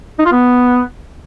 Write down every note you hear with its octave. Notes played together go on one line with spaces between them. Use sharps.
D#4
F4
B3